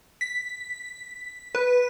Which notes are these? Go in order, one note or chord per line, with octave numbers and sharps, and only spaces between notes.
B6
B4